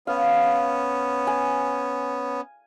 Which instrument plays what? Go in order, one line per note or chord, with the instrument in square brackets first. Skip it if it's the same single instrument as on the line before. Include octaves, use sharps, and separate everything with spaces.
[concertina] B3 C#4 [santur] F5
[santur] G#5